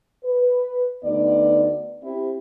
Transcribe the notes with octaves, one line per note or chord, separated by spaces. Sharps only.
B4
D2 B3 D#4 D5
C4 E4 G4